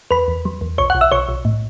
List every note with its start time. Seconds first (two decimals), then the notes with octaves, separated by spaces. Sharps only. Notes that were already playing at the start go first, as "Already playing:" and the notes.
0.11 E2 B4 B5
0.28 E2
0.45 F#3
0.61 E2
0.78 B1 C#5 C#6
0.90 B1 F#5 F#6
1.01 E5 E6
1.12 B1 C#5 C#6
1.29 B1
1.45 A2